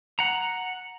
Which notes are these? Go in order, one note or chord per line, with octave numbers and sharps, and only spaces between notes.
F#5 A#5